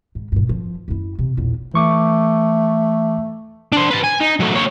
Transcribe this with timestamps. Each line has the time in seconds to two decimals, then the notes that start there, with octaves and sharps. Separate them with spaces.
0.15 G#2
0.32 G2 A#2
0.49 F3
0.88 F#2 E4
1.19 C3
1.37 A#1 E2
1.74 E3 A3 C#6 D6
3.72 D4 C5
3.90 B4 A5
4.03 G#5
4.20 D#4
4.40 F#3 A3
4.53 A#3 C#5